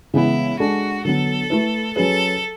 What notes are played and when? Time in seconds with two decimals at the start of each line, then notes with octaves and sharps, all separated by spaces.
0.14 C#3 E3 G#3 B3 E4
0.59 G#3 D4 F#4 A4
1.05 D3 F#3 B3 A4
1.50 A3 E4 B4
1.96 F#3 C#4 G#4 A4 B4